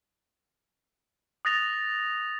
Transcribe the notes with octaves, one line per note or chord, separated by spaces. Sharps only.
D#6 F#6 A6 A#6 F7